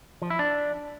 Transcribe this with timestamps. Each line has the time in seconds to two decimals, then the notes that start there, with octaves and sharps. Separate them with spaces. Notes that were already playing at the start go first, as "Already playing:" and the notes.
0.22 F3
0.30 E4
0.39 D4